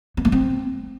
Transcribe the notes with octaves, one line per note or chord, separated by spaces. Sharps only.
B3
A#3
C4